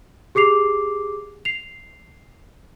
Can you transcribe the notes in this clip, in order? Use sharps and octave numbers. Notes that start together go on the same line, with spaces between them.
G4 G#4 D6 C7 F7
C7 F7